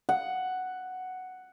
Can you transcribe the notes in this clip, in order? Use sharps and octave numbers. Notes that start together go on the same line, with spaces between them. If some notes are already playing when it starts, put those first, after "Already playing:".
F#5